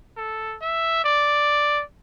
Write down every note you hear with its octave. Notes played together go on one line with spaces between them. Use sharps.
A4
E5
D5